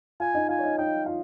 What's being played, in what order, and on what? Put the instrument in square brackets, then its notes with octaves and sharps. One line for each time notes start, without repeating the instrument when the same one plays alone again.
[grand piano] F4 F5 [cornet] G#5
[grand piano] D#4 D#5
[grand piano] F4 F5 [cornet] G#5
[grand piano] C#5
D#4 D#5
[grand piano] D#4 D#5 [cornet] G5
[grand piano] F4 F5